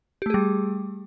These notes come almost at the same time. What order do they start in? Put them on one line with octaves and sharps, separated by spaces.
G4 A3 G#4 G3